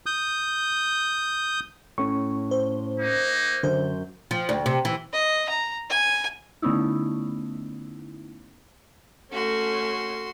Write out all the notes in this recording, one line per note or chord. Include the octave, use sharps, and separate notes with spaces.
D#6 G6
A2 C#4 C#6
C5
A#3 D#4
F#2 D3 C5 G6
F3
D2
C3
E3
D#5
A#5
G#5
D3 A3 B3 C#4 D#4 E4
A3 C#4 F#4 C6